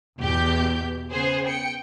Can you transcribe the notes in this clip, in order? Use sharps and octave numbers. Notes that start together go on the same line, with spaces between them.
E2 B2 G4 G6
C#3 B3 G#4 C5
G5 C#7